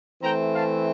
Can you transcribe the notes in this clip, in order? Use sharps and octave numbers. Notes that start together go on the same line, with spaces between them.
E3 A3 C4 G5 A#5
F5 A5